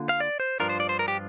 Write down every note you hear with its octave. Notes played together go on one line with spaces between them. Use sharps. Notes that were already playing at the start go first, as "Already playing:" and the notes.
Already playing: D3 A#3 F4
F5
D5
C5
G2 F3 D4 F4 A#4
C5
D5
C5
A#4
G4